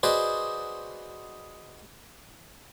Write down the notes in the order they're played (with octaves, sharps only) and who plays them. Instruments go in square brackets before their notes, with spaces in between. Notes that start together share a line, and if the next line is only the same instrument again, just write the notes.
[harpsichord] F#4 G#4 B4 C5 D5 D#5